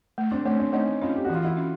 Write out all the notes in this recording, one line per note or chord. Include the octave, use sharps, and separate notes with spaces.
A3
C4 D4
A3 C#4
C4 D4
A3 C#4 D#4
C#4 D#4 F4
G4
F#4
E3
F4
E4 F#4
C#4